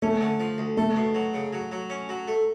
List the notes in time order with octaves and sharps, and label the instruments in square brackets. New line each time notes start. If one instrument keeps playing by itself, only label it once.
[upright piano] A3 [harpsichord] C#4
[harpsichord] D3
F3
D2
[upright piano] A3 [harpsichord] A4
[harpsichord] B2
F#3
C#3
F#3
F#3
C#4
F#3
A3